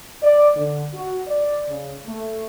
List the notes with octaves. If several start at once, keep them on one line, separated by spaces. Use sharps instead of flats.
D5
D3
F#4
D5
C#3
A3